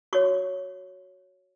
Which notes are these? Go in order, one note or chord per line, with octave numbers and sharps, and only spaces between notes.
F#4 C#5 C#6